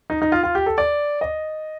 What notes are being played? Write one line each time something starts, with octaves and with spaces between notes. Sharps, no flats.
D#4
D#4
F4
F4
G4
A4
D5
D#5